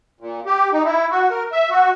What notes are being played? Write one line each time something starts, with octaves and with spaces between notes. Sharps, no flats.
A#2
G4
D#4
E4
F#4
A#4
E5
F#4